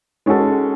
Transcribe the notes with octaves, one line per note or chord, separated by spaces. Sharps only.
G#3 C#4 F#4 A4